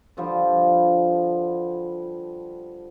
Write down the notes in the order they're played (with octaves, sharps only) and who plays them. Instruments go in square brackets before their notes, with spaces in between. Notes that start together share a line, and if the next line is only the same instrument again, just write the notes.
[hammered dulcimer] D3 F3 G3